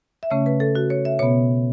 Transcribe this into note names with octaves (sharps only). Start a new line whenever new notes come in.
E5
C#3 A3 C#4 C#5
B4
A4
F#4
C#5
E5
B2 B3 C#5